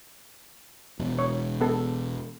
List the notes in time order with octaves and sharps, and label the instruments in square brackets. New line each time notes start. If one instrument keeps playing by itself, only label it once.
[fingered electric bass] E1
[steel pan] C#5
B3 A4